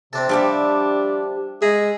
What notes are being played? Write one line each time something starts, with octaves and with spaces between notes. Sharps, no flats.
C3 C4 D4 A4
F3 G3 D4 G4 E5
G#3 G#4 E5 A#5